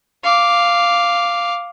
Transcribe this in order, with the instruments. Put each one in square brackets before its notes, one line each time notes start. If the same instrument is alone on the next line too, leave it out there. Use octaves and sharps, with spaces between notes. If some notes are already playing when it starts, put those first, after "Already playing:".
[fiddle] F5 D6